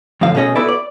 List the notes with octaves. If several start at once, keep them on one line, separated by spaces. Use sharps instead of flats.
F2 A2 D3 F5
B2 A3 C#4 G#4 D#5
B3 E4 F#4 A4 B4 D5
D5